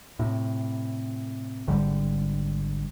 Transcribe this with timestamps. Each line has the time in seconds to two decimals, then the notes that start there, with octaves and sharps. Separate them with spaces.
0.19 A2 C3
1.67 G#1 G#2 D3 G3